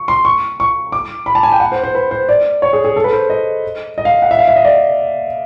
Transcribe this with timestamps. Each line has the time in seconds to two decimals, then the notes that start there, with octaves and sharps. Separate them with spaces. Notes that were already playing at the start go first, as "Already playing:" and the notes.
Already playing: C#6
0.08 C6
0.25 C#6
0.60 C#6
0.92 D6
1.26 B5
1.35 A5
1.43 G#5
1.52 G5
1.60 F#5
1.72 C5
1.84 C5
1.95 B4
2.11 C5
2.29 D5
2.62 C#5
2.73 G#4
2.85 G#4
2.96 A4
3.04 B4
3.13 C5
3.30 D#5
3.98 D#5
4.05 F5
4.22 F#5
4.31 E5
4.39 F5
4.48 E5
4.56 D#5
4.65 D5